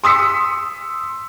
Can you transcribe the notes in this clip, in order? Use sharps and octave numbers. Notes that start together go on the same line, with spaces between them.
C6 D#6 E6 B6 C#7